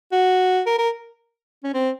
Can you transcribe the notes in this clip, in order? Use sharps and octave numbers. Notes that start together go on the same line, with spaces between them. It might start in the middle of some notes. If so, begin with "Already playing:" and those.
F#4
A#4
A#4
C#4
C4